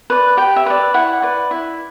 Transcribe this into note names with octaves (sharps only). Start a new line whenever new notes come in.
B4 D5
G4 G5
E5
B4 D5
E4 F#5
B4 D5
E4